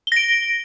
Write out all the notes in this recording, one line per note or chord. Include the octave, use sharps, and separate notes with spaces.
A#6 D7 G7